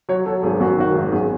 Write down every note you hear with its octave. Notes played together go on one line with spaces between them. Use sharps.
F#3 C#5
F#3 A4
G#1 G#4
F#2 F#4
D#3 F#4
G#1
F#2 G#4